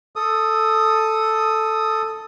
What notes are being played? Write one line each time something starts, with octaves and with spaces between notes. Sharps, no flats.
A4 D#6